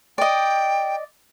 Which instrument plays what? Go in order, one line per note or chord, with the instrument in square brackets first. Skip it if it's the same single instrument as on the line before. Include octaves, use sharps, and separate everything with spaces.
[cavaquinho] D5 D#5 [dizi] G5